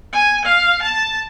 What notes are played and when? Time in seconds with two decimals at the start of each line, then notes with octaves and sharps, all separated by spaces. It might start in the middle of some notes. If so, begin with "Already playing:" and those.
0.13 G#5
0.45 F5
0.82 A5